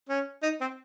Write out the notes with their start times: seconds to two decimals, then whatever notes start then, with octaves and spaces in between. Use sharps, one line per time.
0.09 C#4
0.43 D#4
0.61 C4